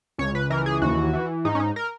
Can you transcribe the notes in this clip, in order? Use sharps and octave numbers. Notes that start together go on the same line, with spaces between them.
C#2 C#5
B4
E3 A#4
G#4
D#2 F#4
E3
G#2 D#4
C#4
D#4
A#4